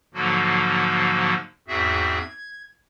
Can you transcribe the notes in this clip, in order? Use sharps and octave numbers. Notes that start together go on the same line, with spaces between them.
G#2 D3 F3 F#3 A#3 F#4
E2 G#2 C4 F#4 G#4 E5
G#6